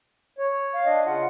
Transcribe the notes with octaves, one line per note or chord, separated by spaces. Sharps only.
C#5
F5
D4 D#5
C#3 F4 F#5